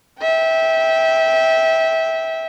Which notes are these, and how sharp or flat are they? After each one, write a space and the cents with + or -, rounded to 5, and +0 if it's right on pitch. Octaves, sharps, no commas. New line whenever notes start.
E5 -20 G5 +0